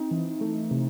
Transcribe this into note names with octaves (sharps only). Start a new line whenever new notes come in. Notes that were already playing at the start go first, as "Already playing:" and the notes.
Already playing: C4 D#4
E3
A3
C3